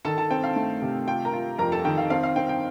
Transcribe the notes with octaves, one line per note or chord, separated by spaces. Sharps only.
D#3 A4 A5
A4 A5
C4 G5
F5
A3
C3
F4 G5
A#4 A#5
F4
F2 A#4 A#5
A4 A5
D#3 G5
F5
C4 F5
F5
C4 G5
G5